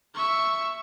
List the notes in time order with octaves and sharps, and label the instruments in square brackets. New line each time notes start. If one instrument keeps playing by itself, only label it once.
[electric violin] E5 C#6